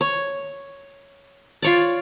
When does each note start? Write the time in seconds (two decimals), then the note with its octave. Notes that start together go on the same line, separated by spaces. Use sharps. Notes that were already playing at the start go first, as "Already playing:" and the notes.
0.01 C#5
1.62 F4 C#5 D5